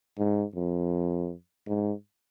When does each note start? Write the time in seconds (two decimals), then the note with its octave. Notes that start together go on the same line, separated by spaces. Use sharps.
0.18 G#2
0.55 F2
1.66 G#2